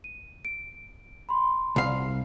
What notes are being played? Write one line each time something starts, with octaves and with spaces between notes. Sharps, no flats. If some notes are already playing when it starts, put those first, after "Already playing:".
D#7
D7
B5 C6
C2 F5